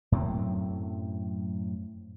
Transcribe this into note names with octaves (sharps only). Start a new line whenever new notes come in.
F#2 A2 F#3 C4